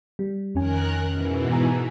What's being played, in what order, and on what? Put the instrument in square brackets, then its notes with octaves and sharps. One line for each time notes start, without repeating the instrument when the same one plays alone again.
[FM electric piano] G3
[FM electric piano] F2 C#4 G#5 [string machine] D#3 A#4 F#6
[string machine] G#2 B2 E3
[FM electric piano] G#5 A#5